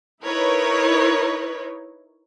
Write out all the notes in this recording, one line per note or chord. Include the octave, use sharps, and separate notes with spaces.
D#4 E4 A#4 B4 C#5